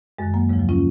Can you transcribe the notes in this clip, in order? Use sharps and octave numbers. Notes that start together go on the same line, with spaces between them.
F#2 D#3 G#3
F#3 A#3
D#2 C#3 F3 G#3
F#3
C#4 F4